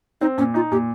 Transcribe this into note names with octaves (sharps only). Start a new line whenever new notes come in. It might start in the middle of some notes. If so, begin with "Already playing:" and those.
C4 D#4
A#2 C#4
D#4 F4
A#2 G4